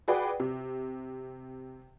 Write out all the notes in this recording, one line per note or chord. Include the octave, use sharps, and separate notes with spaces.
F#4 G#4 B4 D5 F#5 G5
C3